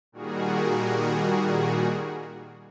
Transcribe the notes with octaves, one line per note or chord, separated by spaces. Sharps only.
A#2 D#3 G3 F#4 G#4 A#4